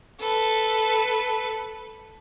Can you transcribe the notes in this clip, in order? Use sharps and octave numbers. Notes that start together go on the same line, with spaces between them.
A4 B4